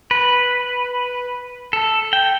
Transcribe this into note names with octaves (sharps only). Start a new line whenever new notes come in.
B4
A4
G5